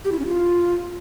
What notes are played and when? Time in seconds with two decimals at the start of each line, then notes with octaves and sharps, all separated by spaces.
0.05 G4
0.12 E4
0.19 C#4
0.26 F4